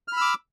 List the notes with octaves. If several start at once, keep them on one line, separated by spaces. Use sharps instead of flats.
B5 D6 E6 F6